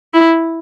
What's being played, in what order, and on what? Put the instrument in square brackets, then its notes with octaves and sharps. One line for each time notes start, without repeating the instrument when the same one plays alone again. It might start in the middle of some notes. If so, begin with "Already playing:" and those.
[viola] E4